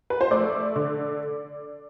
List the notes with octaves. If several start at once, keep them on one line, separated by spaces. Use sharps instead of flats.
B4
C5
A3 D5
D3